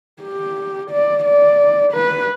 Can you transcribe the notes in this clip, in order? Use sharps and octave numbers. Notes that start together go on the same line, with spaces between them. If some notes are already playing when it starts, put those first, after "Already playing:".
G4
D5
D5
B4